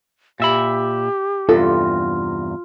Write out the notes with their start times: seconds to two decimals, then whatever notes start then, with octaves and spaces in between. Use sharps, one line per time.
0.40 A#2 G4 E5 B5
1.49 E2 G2 C3 F4 A4